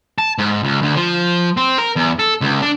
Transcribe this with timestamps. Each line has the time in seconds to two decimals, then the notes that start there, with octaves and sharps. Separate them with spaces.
0.18 A5
0.38 G#2
0.63 C#2
0.82 D2
0.96 F3
1.57 C4
1.78 A#4
1.96 E2
2.19 A4
2.41 C#2
2.62 D4